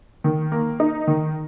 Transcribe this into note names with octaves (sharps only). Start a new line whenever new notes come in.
D#3
A#3
D#4
D#3